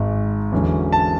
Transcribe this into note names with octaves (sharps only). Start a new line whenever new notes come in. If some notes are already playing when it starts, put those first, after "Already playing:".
Already playing: G#1 G#2 G#3
E2 D3 F#3 C#4
A5